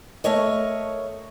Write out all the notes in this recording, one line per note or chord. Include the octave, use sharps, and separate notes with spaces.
A3 A#4 C#5 D#5